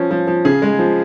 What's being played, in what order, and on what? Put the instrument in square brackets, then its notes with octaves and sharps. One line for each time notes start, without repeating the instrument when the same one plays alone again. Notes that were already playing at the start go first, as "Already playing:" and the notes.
Already playing: [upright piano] F3 C#4
F3
F3
C#3 G#4
G#3
F3